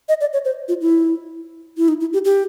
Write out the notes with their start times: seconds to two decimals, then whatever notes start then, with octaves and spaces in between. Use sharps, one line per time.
0.09 D#5
0.21 D5
0.33 C#5
0.45 C5
0.68 F4
0.81 E4
1.78 E4
1.88 D#4
2.01 E4
2.13 G4
2.25 G4